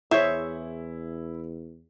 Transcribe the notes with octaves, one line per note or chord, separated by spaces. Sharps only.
E2 E4 G#4 C5 C#5 E5